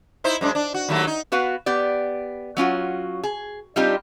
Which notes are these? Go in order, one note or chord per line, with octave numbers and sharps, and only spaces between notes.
D#4 E4 C5
F#2 G#3 D4
D4
F#4
D#2 F#3 A3
D#4
B3 F#4 B4 F5
B3 G4 D5
F#3 C#4 F4 F#4
G#4
G3 C4 D4 D#4 F4 G4